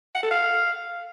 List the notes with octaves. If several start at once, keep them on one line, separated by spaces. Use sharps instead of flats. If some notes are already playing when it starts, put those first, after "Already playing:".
F#5
A4
F5